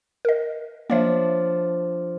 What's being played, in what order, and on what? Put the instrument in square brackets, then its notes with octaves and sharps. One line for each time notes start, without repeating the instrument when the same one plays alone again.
[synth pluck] A#4 D#5
[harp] F3 D4 [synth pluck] A#3 C#5 E5